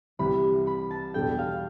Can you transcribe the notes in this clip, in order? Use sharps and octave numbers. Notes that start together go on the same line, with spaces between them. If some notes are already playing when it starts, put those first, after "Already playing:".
C2 C3 E3 G3 B5
B5
A5
E2 B2 G3 D4 A4 G5
F5